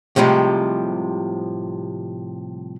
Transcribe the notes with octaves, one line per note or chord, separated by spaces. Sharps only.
A2 C3 F3 G3 G#3